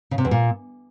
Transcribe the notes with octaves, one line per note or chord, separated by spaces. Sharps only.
C#3
C3
E2
A#2